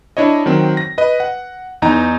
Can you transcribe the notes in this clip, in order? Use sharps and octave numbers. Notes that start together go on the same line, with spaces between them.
D4 E4 C#5 D#5
D#3 F#3 C4
A#6
B4 D#5
F#5
E2 D#4 A#5